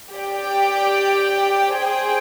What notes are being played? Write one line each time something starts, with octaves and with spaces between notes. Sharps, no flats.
G4 D5 G5
G#4 C5 G5